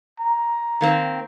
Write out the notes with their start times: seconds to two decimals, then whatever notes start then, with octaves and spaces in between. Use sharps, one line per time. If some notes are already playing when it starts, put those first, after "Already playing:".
0.20 A#5
0.81 D#3 A#3 C4